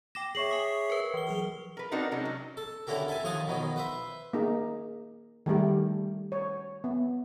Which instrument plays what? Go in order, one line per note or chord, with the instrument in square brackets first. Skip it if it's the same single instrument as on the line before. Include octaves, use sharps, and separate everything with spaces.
[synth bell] G5 D6 A#6 [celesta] E7
[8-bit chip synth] G#4 C#5 E5 [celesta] C#6 C7 F#7
[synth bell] G#5 D#6 B6
A#4 B4
E3 G7
[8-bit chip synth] F#3 G#4 A#4
[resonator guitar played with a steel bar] A#4 B4
C4 D4 D#4 F#4 A#4
C3 F#3 G#3 C#4 D#4
F#3
[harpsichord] A4
D3 C#4 E4 F#4 G4 A#4
A4 E5 G#5 A5
D#2 F3 D#5 F5 F#5 G#5
B2 D#3 F3 F#3
B4 C5 E5
[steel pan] A#3 D#4 G#4
D#3 G3 A3 G4
C#5
B3